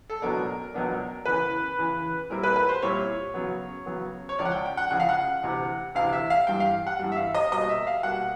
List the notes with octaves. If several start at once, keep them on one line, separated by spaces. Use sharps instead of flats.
A4
C#2 B2 F#3 B3 D4 A#4
C#2 B2 F#3 B3 D4
E2 C#3 E3 B4
E2 C#3 E3
A#2 G3 C4 E4 A#4
B4
B4
C5
A#2 G3 C4 E4 C#5
C#3 F#3 B3
C#3 F#3 B3
C#5
C#2 C#3 F3 D5
F#5
G5
G5
F#5
C#2 C#3 F3 F#5
F5
F#5
D2 C3 E3
D2 C3 E3 F5
E5
F5
G2 E3 G3 G5
F5
F#5
G2 E3 G3
E5
F5
D#5
B2 G3 A#3 D#5
E5
F5
B2 G3 A#3 F#5